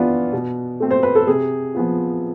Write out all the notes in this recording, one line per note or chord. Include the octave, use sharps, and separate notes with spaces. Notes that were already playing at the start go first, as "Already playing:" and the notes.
Already playing: E3 B3 D4 F4
B2
A3 C4
C5
B4
A4
C3 G#4
F3 B3 F4